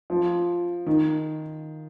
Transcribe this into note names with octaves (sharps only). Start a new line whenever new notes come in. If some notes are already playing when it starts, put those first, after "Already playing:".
F3
D#3